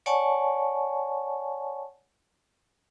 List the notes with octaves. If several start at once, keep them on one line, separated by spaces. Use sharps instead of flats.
C#5 D5 F#5 G#5 A5 C#6